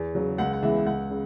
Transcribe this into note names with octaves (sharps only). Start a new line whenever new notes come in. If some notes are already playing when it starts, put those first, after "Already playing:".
Already playing: E2
C#3 F#3
C#2 F#5
F#5
C#3 E3 G#3 B3 E5
C#2 F#5
C#3